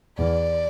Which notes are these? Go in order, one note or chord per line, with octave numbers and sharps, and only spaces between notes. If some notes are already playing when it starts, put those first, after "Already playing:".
E2 D5